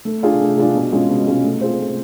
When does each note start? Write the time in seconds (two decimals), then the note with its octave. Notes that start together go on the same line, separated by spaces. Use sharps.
0.05 A3
0.22 D4 F4 G#4
0.41 A3
0.58 D4 F4 G#4
0.75 B2
0.92 G#3 C#4 F4 G#4
1.09 B2
1.27 G#3 C#4 F4 G#4
1.44 A3
1.61 C4 F4 G#4 C5
1.79 A3